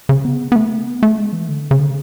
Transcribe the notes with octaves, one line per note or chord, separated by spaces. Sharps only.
C#3
B3
B3
A3
B3
A3
G#3
E3
D3
C#3
D3